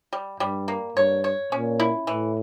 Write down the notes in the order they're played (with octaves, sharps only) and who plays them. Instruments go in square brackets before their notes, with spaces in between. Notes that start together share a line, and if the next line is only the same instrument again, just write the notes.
[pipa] G3
[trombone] G2 [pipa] G3
[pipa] A#3
[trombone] G2 [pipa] C#5
[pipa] C#5
[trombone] A#2 [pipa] C#4
[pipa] E4
[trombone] A2 [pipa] E3